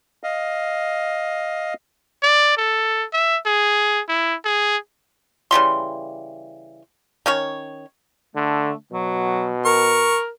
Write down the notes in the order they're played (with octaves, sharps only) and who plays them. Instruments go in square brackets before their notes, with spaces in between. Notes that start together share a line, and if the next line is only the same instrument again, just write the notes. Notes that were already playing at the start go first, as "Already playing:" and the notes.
[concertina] D#5 F5
[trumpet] D5
A4
E5
G#4
E4
G#4
[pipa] C#3 E3 G3 C6
D#3 C#4 C#5
[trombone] D3 [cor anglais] A3
[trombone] B2 [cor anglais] F#3
[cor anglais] A#4 [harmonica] C#6